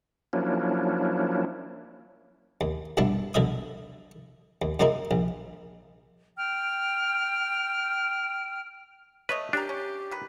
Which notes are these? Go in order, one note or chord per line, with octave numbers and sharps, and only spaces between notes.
F3 F#3 A#3 C#4 D4 E4
D#2
B1 G2 D4 E4 A5
B1 D3 D#5 E5 D#6
D#2
F#2 C#3 A#3 D#4 E4
A#1
G5 F6
A3 B4 C#5 D#5
C#4 D4 G4 A#4
C#4
D#3 B4